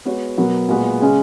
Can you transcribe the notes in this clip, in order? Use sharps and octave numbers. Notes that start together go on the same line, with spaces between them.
G#3 B3 F#4 C#5
B2 F#3 B3 F#4 A#4
A#2 G#3 B3 F#4
C#3 G#3 C#4 G#4